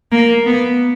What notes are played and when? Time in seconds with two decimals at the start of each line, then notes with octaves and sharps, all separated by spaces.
0.12 A#3
0.47 B3